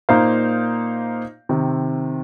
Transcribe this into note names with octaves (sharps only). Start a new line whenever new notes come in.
A#2 A#3 D#4 C5 F5
C3 D#3 C4